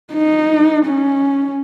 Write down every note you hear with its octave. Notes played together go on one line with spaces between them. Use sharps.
D#4
C#4